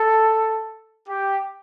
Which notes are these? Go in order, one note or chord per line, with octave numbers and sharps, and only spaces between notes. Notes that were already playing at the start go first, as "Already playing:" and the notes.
Already playing: A4
G4